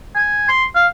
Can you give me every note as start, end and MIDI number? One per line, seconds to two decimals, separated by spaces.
0.15 0.45 80
0.49 0.65 84
0.75 0.88 77